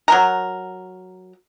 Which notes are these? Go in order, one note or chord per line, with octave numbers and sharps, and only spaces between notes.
F#3 A#4